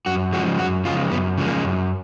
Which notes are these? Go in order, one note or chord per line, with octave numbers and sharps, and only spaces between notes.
F#2 F#4
C#3 F3 G#3 F#4
F#2 F#4
C#3 F3 G#3 F4
F#2 B3
C#3 F3 G#3
A#3
F#2